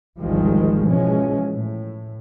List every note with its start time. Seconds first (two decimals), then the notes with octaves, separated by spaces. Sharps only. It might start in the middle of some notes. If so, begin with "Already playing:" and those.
0.18 G#1 D2 D#3 F3 G3 G#3
0.88 B2 E3 F3 G#3 C#4
1.51 A2